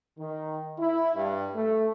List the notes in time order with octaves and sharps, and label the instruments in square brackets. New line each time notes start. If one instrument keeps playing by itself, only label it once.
[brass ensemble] D#3
E4
G2
A3